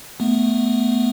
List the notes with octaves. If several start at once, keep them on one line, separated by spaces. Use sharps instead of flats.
A3 B3